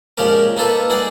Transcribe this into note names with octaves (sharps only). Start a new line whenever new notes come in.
A#2 F3 G#3 C#4 G4 A#4
A#3 D#4 F4 A4 B4
D#4 G#4 D5 F#5